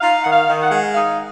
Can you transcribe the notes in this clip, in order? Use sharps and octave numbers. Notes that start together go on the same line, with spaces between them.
D#4 F5
D#3 F#5
F5
D#3
F#5
G#3
D#4 F5